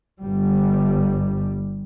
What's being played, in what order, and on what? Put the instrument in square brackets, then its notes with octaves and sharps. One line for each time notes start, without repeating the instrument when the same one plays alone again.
[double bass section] G1 G3